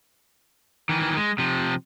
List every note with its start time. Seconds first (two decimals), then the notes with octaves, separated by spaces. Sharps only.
0.89 D#3 E3
1.17 G#3
1.38 C3 F3